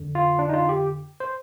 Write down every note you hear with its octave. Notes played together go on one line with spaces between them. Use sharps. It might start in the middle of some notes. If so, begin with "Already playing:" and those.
Already playing: F2 D3
F4
D4
D#4
F4
G4
C5